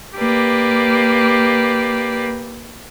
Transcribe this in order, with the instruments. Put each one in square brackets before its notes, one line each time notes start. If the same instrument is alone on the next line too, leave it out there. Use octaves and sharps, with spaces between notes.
[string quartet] A#3 G4 B4 D5